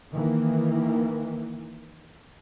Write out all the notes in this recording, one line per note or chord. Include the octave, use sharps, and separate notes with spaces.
D#3 E3 A#3